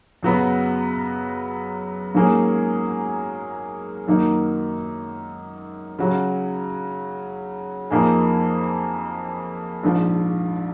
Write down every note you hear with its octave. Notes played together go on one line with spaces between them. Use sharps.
F#2 C#3 F#3 B3 F#4
G#2 F#3 A#3 C#4 G#4
F#2 D#3 A#3 D#4 F#4
C#3 F#3 C#4 F#4
F2 F3 A#3 D#4 G#4
A#1 G#2 F3